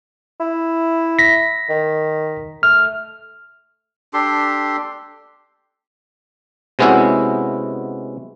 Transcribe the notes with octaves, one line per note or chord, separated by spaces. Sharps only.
E4
A#6 B6
D#3
A3 F6
D4 G4 A4 C6
C3 G#3 B3 C#4 E4 F#4